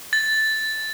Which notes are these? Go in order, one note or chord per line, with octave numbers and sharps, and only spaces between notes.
A6